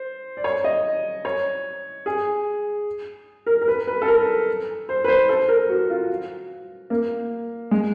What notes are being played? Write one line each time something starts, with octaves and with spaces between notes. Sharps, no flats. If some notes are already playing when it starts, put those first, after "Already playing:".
Already playing: C5
D5
C#5
D#5
C#5
G#4
A#4
A#4
B4
B4
A4
A#4
C5
B4
C5
A4
A#4
F#4
F4
A#3
G#3